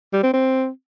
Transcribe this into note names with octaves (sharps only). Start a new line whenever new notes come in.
G3
C4
C4